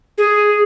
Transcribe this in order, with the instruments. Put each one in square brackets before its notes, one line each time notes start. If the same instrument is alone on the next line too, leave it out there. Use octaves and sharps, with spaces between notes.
[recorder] G#4